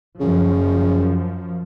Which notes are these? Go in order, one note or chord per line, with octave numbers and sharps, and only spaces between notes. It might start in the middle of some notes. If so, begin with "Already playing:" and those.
F#2 C#3 F3